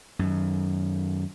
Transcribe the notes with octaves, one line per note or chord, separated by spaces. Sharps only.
F#2 D#3